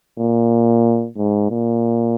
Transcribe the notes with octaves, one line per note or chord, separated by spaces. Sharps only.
A#2
G#2
A#2